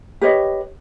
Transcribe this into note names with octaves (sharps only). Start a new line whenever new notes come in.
G4 B4 C#5 D#5